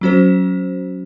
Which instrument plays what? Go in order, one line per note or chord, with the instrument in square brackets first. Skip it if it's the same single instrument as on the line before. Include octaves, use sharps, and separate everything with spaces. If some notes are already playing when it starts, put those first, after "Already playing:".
[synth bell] F#3 C#4 F#4 C5